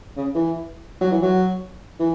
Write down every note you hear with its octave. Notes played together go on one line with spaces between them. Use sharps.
C#3
E3
F#3
E3
F#3
E3